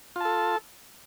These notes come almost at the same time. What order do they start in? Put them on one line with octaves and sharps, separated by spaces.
F4 A5 A4